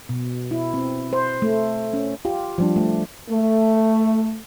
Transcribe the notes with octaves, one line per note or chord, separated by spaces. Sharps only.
B2
E4
C4
C5
A3
C#4
F4 G4
F3 G3 D4
A3
A3